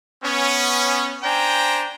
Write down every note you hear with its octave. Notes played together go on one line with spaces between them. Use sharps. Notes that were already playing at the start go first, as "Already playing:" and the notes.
B3 C#4
D4 C5 G5 G#5 A#5